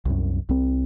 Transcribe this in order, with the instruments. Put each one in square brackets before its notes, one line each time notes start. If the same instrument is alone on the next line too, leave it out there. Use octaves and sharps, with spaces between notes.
[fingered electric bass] C2 F#2
C2 C4